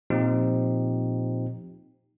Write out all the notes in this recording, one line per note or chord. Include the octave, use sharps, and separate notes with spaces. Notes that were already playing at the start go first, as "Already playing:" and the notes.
A#2 F3 C4 D#4 G4